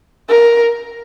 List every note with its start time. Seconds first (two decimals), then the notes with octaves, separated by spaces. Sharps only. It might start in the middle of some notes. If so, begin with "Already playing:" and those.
0.29 A#4